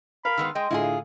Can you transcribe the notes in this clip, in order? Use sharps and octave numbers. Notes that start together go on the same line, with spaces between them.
A#4 F5 B5
D#3 G#3 B3 E6
G#3 D#5 G5
A2 D3 A3 E4 F4 G#4
F5